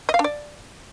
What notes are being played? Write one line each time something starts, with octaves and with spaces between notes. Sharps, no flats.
D#5
F5
D4
D5